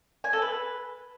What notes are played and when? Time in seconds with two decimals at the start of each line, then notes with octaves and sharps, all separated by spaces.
0.24 G#5
0.33 A4
0.42 B4